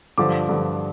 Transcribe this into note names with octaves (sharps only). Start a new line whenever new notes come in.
G2 D3 F3 D6
G2 D3 F3